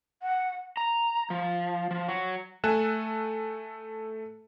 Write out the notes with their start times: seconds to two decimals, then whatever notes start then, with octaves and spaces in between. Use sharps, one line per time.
0.22 F#5
0.77 A#5
1.30 F3
1.91 F3
2.09 F#3
2.64 A3 A4 G#5 F#6 E7